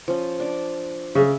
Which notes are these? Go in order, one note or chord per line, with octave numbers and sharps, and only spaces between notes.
F3 C#4
D4 D5
C#3 E5